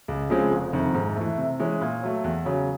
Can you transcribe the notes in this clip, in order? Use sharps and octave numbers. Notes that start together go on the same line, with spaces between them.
C#2
C#3 F3 G#3 C4
F1
F2 C3 D#3
G#2
E3 A3
C3
E3 G#3 C#4
A#2
F#3 A3
E2
C#3 F#3